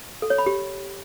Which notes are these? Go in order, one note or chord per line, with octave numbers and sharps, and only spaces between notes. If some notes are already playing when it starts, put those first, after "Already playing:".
A4
C#5
B5
G4